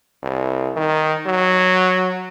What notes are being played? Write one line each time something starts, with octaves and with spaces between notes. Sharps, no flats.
C2
D#3
F#3